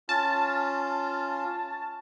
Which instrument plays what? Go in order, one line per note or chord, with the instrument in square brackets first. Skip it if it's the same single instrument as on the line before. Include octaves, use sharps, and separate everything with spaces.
[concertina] C#4 F4 [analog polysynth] A5